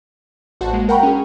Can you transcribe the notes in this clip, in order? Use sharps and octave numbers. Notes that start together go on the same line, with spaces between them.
A1 F#4 C5 F#5 A5
G#3 A#3
A#4 F#5 G5 A#5 B5 C#6
C#4 G#4